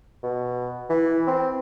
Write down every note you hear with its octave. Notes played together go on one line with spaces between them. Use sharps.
B2
E3
C4